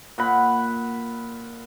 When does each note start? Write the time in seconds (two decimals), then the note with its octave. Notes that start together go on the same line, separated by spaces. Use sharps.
0.18 A#2 F#5 B5